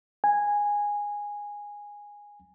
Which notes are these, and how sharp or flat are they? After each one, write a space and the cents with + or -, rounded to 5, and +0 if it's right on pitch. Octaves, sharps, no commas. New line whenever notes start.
G#5 -10